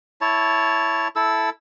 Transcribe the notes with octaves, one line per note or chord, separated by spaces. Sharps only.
E4 C#5 A5
E4 A4 E6